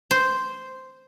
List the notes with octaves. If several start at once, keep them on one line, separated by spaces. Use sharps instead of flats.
C5